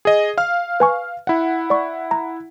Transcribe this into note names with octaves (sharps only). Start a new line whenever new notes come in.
G#4 D#5
F5 F6
B4 G#5 C#6
E4 F#5
D5 C#6
A#5